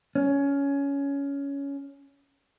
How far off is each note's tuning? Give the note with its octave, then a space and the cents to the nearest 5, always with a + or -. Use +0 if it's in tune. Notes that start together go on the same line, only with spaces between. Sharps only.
C#4 +15